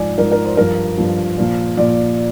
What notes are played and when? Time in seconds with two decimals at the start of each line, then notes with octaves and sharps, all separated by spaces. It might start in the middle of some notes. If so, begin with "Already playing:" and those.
Already playing: G#2 F3 D5 G#5
0.18 G#2 F3 A#4
0.32 A#4
0.45 C5
0.57 G2 F3 A#4
0.98 G2 F3
1.37 A#2 F3
1.77 A#2 F3 D5